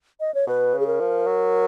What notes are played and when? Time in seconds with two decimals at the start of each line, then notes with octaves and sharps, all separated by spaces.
0.20 D#5
0.35 C#5
0.47 B2 B4
0.74 C#3
0.80 G#4
0.87 A#4
1.00 F3
1.27 F#3